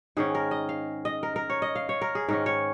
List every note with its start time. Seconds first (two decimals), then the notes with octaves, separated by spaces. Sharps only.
0.17 G#2 D#3 C#4 G#4
0.35 A#4
0.51 D#5
0.69 F5
1.05 D#5
1.23 A#4
1.36 A#4
1.50 C#5
1.62 D#5
1.75 F5
1.89 C#5
2.02 A#4
2.15 G#4
2.28 G#2 D#3 C#4 A#4
2.46 C#5